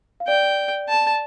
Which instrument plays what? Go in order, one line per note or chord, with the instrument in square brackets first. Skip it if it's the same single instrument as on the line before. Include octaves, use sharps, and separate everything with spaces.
[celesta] F5
[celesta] D5 [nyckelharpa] G5
[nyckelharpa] A5